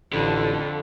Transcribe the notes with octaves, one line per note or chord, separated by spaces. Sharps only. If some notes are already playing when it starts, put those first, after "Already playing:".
A1 F2 D3